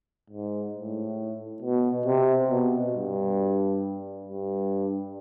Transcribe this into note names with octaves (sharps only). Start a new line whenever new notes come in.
G#2
A2
B2
C3
B2
G2
G2